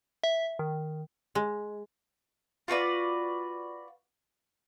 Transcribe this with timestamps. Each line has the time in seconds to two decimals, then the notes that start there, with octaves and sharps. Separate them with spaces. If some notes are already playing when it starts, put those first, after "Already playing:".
0.24 E5
0.59 D#3
1.35 G#3
2.68 F4 F#4 B4 D5